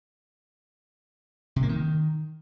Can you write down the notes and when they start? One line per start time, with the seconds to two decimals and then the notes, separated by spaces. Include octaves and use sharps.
1.56 C3
1.63 A#3
1.69 D#3